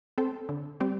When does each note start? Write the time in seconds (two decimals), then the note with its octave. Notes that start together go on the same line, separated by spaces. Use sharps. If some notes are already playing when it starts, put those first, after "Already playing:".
0.18 C4 A4 C5
0.49 D3
0.80 G3 C4